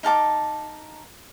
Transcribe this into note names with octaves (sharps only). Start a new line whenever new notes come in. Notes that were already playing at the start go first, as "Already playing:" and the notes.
D#4 F5 A5 D6